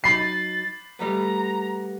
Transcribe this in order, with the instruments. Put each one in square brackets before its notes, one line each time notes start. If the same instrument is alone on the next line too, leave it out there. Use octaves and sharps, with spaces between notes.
[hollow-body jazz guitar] F#3 D#4 [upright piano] B5 C7 [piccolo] A6
[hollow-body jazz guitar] G3 A3 B3 [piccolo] A#5